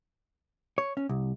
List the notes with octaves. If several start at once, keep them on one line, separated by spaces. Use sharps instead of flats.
C#5
C#4
C2